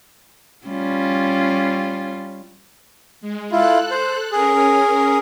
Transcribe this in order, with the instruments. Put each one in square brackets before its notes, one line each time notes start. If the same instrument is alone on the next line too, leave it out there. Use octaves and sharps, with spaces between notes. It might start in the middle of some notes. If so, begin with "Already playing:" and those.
[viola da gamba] G3 C#4 F4
[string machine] G#3
[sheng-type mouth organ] E4 F4 [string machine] A4 F#6
[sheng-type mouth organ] C5
[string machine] C#4 A#4 [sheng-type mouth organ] G#4